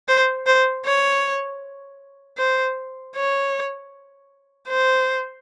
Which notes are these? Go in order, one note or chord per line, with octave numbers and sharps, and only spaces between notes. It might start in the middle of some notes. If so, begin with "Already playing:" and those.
C5
C5
C#5
C5
C#5
C5